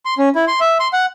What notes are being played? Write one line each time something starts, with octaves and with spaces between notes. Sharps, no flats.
C6
C#4
E4
C6
E5
C6
F#5